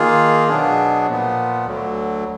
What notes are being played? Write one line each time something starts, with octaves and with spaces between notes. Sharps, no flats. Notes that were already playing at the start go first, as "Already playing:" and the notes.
Already playing: D#3 A#3 F4 G#4
B2 F#3 B3 D4 G#4
A#2 F3 B3
D2 D3 F#3